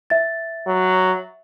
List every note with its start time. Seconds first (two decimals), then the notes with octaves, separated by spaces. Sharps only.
0.10 E5 A6
0.67 F#3